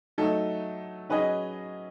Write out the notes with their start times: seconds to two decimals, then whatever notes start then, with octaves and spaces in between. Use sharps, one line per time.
0.18 F#3 A3 D#4 A4
1.09 F#3 C#4 G#4 B4 D#5